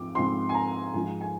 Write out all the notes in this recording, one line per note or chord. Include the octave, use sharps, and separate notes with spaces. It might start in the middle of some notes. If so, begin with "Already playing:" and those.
Already playing: G#2 F3 C4 D6
G#2 F3 C4 C6
G#5
A#5
G#2 F3 G#3 G#5
G#5